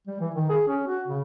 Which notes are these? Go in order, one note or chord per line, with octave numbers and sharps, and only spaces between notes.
G3
E3
D#3
G#4
C#4
F#4
C#3